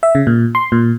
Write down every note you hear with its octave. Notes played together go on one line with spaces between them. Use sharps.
E5
C#3
A#2
C6
A#2